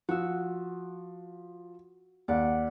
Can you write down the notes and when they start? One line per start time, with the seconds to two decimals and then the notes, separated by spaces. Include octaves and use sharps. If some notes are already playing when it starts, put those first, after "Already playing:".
0.09 F3 F#4 E6
2.28 D#2 D5 F#5